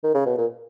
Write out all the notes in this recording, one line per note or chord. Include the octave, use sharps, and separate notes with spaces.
D#3
C#3
B2
A#2